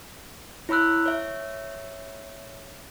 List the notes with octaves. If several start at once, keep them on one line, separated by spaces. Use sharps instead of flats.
E4 C#5 B5 E6 F#6
C#5 E5